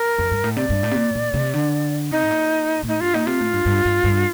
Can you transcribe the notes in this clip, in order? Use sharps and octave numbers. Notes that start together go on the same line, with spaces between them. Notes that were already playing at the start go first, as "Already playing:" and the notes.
Already playing: A#4
F2
G2
A2
C3 D5
G2
A2
C3
A#2
A#2
C3
D3
C3 D#4
A2
A#2
A#2
A2 D#4
G2 F4
A#2 D#4
C3 F4
A2
G2
G2
G2
G2